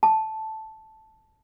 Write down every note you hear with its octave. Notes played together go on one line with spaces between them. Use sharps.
A5